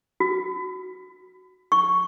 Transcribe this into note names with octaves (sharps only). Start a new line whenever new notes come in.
F#4
C#6